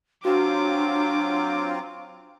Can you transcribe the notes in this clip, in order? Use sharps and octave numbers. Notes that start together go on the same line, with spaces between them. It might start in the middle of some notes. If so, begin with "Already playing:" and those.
F#3 C4 D4 F4 F#4 D6